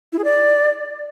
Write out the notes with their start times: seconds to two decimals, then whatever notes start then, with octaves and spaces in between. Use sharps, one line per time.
0.13 E4
0.18 G#4
0.24 D5